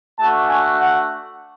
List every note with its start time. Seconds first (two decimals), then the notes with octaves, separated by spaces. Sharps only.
0.18 A3 D4 F#4 A5
0.49 G#5
0.80 F#5